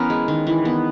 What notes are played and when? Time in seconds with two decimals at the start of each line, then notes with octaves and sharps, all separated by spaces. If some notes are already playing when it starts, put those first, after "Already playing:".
Already playing: E3 B3 C#4 A#4
0.10 G#3
0.28 D#3
0.47 E3
0.65 B3